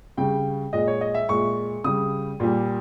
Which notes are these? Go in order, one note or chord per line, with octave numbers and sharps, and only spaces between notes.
C#3 G3 G5
A#2 G#3 D#5
C#5
D#5
E5
A#2 G#3 C#6
C#3 G3 D#6
A#2 G3